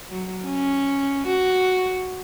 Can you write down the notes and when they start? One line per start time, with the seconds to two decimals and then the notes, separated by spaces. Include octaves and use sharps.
0.10 F#3
0.46 C#4
1.28 F#4